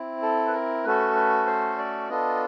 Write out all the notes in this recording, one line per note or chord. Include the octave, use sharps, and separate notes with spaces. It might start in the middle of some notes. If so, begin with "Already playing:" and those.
Already playing: C4 E4
A4
B4
A#4
A3 C#4 F#4 A4 B4
B4
C5
D5
B3 D4 F4 A4 D#5